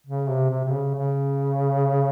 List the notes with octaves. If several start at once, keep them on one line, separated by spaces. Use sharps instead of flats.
C#3
C3
C3
C3
C#3
C#3